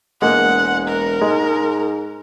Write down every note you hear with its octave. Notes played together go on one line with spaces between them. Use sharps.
E1 G#3 A#3 F#5
A#4
G#2 G#3